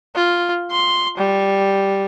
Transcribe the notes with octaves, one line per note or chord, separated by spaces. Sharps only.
F4
C6
G3